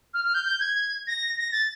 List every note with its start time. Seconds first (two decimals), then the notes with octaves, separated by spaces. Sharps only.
0.14 F6
0.24 F6
0.34 G6
0.44 G6
0.60 G#6
1.07 A#6
1.37 A#6
1.52 A6